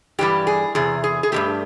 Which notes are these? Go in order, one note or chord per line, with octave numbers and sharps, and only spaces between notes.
G2 E3 G3 G4
G#4
E2 C3 G#4
G#4
G#4
G2 E3 A3 G4